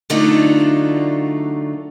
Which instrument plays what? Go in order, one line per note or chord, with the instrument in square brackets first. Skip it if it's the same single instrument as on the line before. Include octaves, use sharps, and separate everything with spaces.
[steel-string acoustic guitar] D3 F#3 A3 D4 D#4 F4